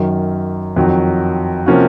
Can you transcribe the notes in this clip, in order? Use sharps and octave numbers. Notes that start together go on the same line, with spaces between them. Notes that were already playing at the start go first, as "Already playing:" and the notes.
Already playing: F#2 D#3 F#3
F2 D#3 F#3
C3 F3 A#3 C#4 F#4